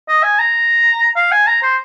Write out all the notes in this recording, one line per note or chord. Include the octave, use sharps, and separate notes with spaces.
D#5
G#5
A#5
F5
G#5
A#5
C5